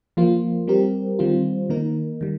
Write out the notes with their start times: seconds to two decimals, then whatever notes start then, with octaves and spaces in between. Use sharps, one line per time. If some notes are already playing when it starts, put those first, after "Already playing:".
0.17 F3 A#3 F4
0.67 G3 C4 G4 A#4
1.19 D#3 G3 C4 F4
1.70 D#3 A#3 D#4 A#4
2.21 D#3 G3